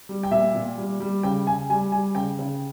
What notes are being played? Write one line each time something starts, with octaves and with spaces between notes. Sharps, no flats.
G3
G5
A#2 E5
A#2
G3
G3
C#3 G5
C#3 G#5
G3 G#5
G3 G#5
C#3 G5
C#3